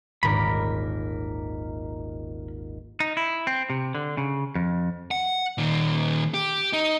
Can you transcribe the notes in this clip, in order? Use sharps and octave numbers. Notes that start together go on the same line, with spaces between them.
D#1 G#1 A#4 B5 D6
D#4
E4
C4
C3
D3
C#3
F2
F#5
A#2 D#3
G4
D#4